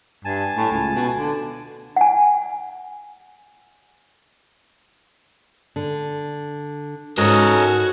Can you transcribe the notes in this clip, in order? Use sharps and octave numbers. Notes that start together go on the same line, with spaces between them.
G2 G#5 A5
A2
C#2
B2
D3
F#5 G#5
D3
G#2 C#4 F#4 A4 A#4 D#5 G#5